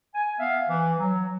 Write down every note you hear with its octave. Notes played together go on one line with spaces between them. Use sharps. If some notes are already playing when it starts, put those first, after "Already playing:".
G#5
B3 E5 F5
E3
F#3